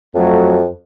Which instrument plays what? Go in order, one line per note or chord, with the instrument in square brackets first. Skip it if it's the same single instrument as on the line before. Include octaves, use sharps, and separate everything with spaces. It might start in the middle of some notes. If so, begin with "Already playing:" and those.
[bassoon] F2 [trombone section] F#3 A3